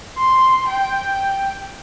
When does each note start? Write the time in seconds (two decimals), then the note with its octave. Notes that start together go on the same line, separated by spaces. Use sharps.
0.18 C6
0.68 G5